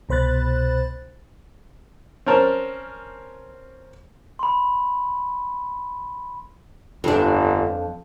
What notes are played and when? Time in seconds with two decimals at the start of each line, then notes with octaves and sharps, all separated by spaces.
0.09 C2 B2 C5 B5 F#6 A6
2.26 C4 C#4 A#4 A5
4.39 B5 C6
7.04 G1 F2 D4